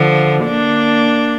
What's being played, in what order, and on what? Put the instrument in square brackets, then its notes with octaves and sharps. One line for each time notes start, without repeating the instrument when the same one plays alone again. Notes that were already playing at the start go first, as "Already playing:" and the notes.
Already playing: [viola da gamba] D3 F3
A#3 D4